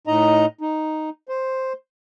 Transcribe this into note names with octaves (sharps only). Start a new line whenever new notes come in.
A2 D#4 D#5 A#5
D#4
C5